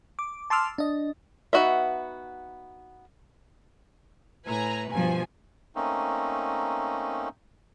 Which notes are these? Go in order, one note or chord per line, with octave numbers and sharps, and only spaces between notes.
D6
A5 C6 D6 E6 F6
D4 D#5
B3 D#4 F#4 D#5 E5
A2 B4 G#5 A#5
G2 B2 F3 G#5
A3 A#3 C4 C#4 D#4